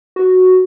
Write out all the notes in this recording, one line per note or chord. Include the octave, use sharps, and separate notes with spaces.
F#4